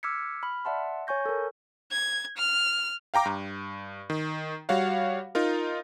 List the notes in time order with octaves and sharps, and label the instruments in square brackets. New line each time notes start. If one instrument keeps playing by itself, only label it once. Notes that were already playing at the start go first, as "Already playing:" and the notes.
[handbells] D6 E6 F6 G#6 B6 C#7
B5 F6
D5 E5 F#5 A5 C6
C#5 G#5 C#6 G6 A#6
A4 A#4
[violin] G#6
F6
[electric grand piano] F5 G5 A#5 D6
G2
D#3
G3 F#4 C#5 F5 F#5
D#4 F4 A#4